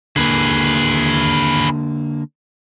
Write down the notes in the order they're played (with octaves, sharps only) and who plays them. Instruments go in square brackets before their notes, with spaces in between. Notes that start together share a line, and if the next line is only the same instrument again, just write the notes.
[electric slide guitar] D3 A#3 [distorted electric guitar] G#4 B4